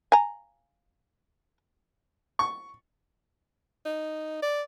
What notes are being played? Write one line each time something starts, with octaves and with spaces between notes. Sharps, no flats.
G#5 A#5
C#6
D#4
D5